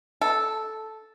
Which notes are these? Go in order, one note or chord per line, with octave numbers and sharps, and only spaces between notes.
A4